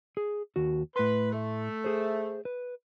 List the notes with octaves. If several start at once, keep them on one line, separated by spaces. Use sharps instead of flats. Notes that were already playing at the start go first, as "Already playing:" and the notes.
G#4
D#2 F#4
A2 B4 C6
A3
G#4 C5
B4